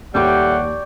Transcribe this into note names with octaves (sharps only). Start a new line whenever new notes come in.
D#2 A2 G3 D5 F#5 G5 C#6